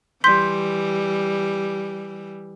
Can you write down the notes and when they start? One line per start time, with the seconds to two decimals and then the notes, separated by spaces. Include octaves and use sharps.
0.24 E3 G3 C6 G6 B6